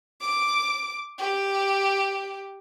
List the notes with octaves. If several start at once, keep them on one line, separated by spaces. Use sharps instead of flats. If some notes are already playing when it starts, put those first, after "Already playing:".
D6
G4